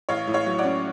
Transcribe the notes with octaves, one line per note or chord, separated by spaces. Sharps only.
A1 C#5 F5
A2
C#5 F5
F#3
D5 F#5
C#4